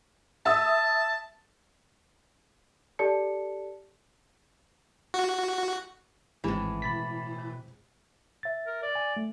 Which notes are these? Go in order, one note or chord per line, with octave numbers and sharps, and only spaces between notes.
E5 A5 D#6 E6
G4 A4 D5 A5 C#7
F#4
G#1 A2 E3 G#3 C4
B2 B5 A6 B6
E5 A6
A#4
D5
G#5
A3